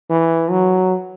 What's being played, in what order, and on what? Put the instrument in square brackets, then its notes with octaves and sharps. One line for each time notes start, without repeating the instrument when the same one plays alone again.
[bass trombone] E3
F#3